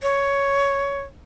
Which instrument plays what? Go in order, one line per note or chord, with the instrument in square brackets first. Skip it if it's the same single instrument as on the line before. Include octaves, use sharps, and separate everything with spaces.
[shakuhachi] C#5